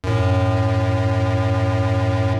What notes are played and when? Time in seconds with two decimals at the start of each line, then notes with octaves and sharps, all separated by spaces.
0.04 F#2 A2